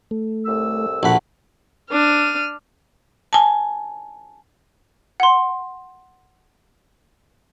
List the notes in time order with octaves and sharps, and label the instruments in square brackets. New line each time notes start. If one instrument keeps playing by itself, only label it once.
[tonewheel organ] A3
[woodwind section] C2 A2 E6
[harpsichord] A#1 B5 [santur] A3 F#4 F#5
[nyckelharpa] D4 [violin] F6 D#7
[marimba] G#5 A5
[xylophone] F#5 C6